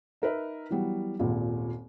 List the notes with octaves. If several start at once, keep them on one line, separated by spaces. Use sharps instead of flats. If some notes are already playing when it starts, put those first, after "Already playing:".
D#4 A#4 B4 E5
E3 F#3 G3 B3
D#1 G#1 A#2